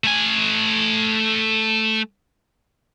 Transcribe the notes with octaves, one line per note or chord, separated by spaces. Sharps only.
A3 G#5